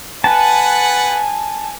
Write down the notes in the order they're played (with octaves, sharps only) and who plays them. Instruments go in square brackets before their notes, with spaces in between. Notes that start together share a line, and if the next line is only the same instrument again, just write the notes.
[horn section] B4 F#5 [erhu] G#5 [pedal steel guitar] A5